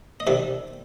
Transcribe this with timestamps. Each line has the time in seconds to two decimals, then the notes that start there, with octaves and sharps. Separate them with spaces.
0.20 D#5
0.27 C3 D#3 G3 E5